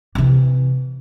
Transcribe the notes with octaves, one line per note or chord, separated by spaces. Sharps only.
C3 E3